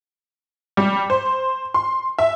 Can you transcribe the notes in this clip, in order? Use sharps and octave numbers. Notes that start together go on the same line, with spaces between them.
G3
C5
C6
E5